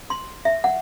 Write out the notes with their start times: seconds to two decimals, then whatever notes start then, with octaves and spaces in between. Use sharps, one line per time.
0.10 C6
0.45 E5
0.64 F#5